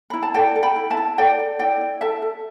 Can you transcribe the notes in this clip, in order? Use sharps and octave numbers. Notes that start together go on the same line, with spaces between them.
E4 B5
A5
A4 D5 G5
A4
G5 B5
E4
E5 A5
E4
A4 D5 G5
A4
E4 D5 G5
E4
A4 E5 A5
A4